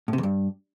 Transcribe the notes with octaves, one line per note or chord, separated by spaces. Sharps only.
A2
C3
E2
G2